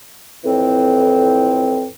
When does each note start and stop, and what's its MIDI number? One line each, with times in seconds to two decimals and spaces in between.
0.44 1.87 41
0.44 1.87 45
0.44 1.87 52
0.44 1.87 60